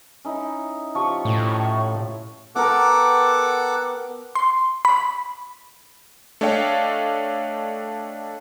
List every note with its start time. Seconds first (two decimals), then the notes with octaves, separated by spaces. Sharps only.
0.25 C#4 D#4 E4
0.95 F3 G4 C#6
1.25 A2
2.55 B3 G4 A4 A#4 F#5 D6
4.35 C6
4.85 B5
6.41 A3 D4 C#5 D#5 F5 G5